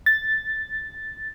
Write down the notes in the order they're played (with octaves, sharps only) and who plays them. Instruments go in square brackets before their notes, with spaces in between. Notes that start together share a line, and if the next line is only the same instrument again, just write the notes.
[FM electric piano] A6